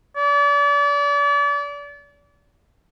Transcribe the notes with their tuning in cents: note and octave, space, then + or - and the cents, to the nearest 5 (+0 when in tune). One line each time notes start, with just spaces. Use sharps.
D5 -35